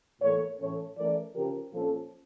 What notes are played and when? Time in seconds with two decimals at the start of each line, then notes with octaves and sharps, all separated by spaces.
0.21 A2 E3 A#3 A4 C#5
0.59 A2 E3 A3 C#4 A4 C#5
0.97 E3 A3 C#4 A#4 D5
1.35 C#3 F3 C#4 G4 A#4
1.73 A#2 F3 A#3 C#4 F4 A4